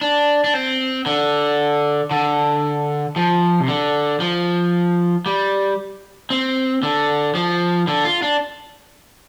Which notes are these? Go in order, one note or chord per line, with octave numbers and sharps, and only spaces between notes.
D4
D4
C4
D3
D3
F3
C3
D3
F3
G3
C4
D3
F3
D3
F4
D4